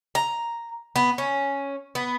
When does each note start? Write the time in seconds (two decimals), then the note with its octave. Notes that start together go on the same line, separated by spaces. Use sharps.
0.15 A#5
0.96 B3
1.18 C#4
1.95 B3